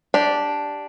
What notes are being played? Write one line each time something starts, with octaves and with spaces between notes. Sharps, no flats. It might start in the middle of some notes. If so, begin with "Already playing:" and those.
D4 G4